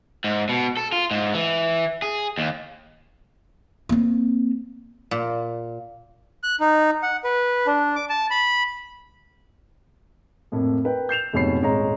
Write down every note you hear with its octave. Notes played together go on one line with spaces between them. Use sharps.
G#2
B2
A4
F4
G#2
E3
G#4
D#2
A#3 C4
A#2
F#6
D#4
F#5
B4
D4
D6
A5
B5
F2 A2 A#3
A#4 B4 G5
G6 C7 E7 F7
F1 G#2 B2 C#5 B5 C7
D#1 G#1 G#3 C#5 A#5